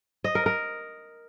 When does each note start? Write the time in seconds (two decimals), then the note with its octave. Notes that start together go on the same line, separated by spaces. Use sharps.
0.24 D#5
0.35 A#4
0.46 A#4